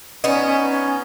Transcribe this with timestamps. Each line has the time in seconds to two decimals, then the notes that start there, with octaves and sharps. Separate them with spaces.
0.24 B3 C#4 D#4
0.47 C#4
0.70 C#4